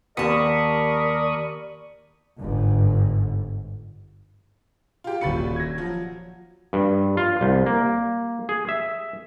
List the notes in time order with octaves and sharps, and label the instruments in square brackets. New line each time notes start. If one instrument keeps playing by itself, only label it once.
[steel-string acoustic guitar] D#2 A5 [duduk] A#4 [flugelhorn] D5 [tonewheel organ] B5 C#6 D#6
[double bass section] G1 G#2
[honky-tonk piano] F4 G4
[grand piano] D#1 F#4 C#7 [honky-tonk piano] A#1 B5 A6
[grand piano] G#6 A#6
[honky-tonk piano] F3 F#3
[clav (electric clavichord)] G2
F4
C2
A#3
G#4
E5